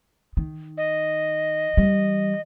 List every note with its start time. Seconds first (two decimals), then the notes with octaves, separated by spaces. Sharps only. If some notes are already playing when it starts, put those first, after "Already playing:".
0.37 D#3
0.78 D#5
1.77 E3 G3